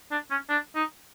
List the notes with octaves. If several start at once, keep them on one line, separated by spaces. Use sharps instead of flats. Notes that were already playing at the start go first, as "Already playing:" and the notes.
D4
C#4
D4
D#4